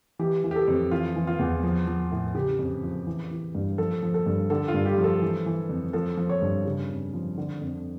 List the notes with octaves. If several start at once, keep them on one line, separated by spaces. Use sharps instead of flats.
E3 G4
E3
G4
A4
F2
E3 F4
E3
F4
E2
F3
F3
A2
C#3 G4
F2
F3
E3
E3
G2
F3 A4
F3
A4
G2
D3 A4
F4
G2
G4
F3
A4
E3
E3
F2
F3 A4
F3
C#5
G2
C#3
F2
F3
D3
F2